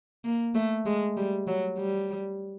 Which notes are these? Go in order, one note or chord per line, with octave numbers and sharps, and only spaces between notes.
A#3
A3
G#3
G3
F#3
G3